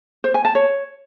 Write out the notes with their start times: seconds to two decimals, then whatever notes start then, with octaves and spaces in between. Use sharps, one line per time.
0.24 C5
0.34 G#5
0.45 A5
0.55 C#5